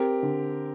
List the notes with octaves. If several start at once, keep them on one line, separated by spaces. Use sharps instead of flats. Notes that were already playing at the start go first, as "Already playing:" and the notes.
Already playing: C4 G4 A#4
D3